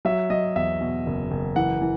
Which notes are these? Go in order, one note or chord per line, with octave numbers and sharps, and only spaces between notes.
F#3 E5
F#3 D#5
E2 E5
B2
F#1
F#1
E3 F#5
E3